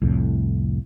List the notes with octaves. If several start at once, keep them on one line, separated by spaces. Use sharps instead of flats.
C2 F2 A2